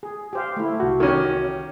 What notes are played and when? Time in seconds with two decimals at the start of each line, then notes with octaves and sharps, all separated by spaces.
0.03 G#4
0.33 G4 C5 F5
0.57 A3 E4
0.80 C2 F#4
1.00 D#3 C#4 G4